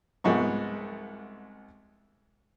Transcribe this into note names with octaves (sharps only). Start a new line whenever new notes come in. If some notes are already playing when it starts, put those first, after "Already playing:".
C2 G#2 F3 B3 C#6